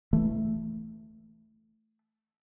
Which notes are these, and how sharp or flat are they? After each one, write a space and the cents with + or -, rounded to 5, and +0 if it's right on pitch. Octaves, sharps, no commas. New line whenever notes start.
E3 +0 A3 +0